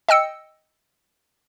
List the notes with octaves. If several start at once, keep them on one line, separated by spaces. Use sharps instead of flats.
D#5 G5 E6 C#7